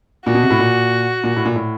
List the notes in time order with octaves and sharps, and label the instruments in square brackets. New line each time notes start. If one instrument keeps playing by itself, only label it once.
[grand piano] A#2 [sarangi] F#4
[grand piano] B2
C3
A2
A#2
A#2
A2
A#2
A2